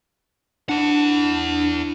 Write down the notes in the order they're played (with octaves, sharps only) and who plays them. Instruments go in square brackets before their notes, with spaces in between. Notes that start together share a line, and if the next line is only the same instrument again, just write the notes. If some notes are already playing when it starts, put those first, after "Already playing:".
[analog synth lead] D4 [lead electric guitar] E4 F#5